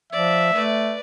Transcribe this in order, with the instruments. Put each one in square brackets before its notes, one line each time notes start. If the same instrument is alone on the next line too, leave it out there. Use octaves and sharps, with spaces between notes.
[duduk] F3 [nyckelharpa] D5 [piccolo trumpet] E5
[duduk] A3 [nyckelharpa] B4 D5